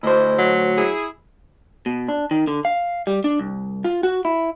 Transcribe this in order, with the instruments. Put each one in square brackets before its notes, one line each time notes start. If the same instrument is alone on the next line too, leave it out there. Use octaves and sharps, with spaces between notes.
[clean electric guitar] D2 C5 [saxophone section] E4 D#5
[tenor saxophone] F#3
[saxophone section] E4 G#4
[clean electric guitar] B2
D4
D#3
D3
F5
G3
D4
C2
F4
F#4
E4